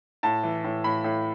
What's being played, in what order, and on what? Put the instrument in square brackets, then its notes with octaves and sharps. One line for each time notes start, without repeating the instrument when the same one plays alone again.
[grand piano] A2 A5
E3
A2
A2 B5
A2